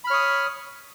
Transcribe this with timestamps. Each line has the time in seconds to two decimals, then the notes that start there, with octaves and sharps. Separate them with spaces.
0.04 B5
0.07 F6
0.10 C#5
0.13 D#6